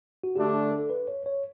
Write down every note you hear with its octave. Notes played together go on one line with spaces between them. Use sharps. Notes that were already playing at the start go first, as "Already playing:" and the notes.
F#4
D3 A3 D4 G4
A4
B4
C#5
C#5